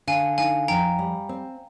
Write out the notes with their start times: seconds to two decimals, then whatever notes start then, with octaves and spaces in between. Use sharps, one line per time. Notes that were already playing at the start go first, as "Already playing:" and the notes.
0.07 D3 F5 G#5
0.38 D#4 F5 G#5
0.68 F2 G5 A#5
0.99 G3
1.29 C4